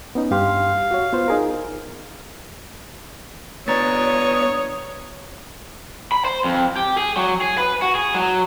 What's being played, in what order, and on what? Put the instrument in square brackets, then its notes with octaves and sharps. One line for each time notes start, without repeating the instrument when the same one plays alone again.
[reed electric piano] B3 C#4 D#4
[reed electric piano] G2 G4 C6 [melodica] F5
[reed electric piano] F#4 C#5
B3 F4 C5
D#4 G#4 A#4
[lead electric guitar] B3 D4 [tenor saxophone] C#5 [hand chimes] A#5 A6 [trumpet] D#6
[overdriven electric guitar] B5
C5
F2
G4
G#4
F#3
G#4
B4
F#4
G#4
F#3